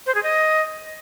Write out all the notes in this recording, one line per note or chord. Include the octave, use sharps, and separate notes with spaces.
C5
G#4
D#5